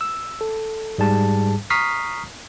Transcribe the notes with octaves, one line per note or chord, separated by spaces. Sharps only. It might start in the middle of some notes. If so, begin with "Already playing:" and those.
E6
A4
G#2 G3 G#4 A5
A#5 C#6 D#6 F6 B6 C7